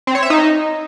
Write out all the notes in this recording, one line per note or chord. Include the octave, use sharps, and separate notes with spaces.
C4
C#5
E5
D#4